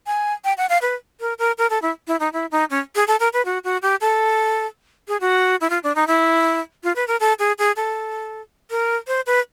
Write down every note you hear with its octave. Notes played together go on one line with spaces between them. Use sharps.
G#5
G5
F#5
F5
B4
A#4
A#4
A#4
A4
E4
E4
D#4
E4
D#4
C#4
G#4
A4
A#4
B4
F#4
F#4
G4
A4
G#4
F#4
E4
F4
D4
D#4
E4
F4
B4
A#4
A4
G#4
G#4
A4
A#4
C5
B4